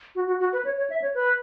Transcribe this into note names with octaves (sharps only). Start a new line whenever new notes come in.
F#4
F#4
F#4
B4
C#5
C#5
E5
C#5
B4